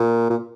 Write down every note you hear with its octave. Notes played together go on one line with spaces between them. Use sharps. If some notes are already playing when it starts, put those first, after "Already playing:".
Already playing: A#2
A#2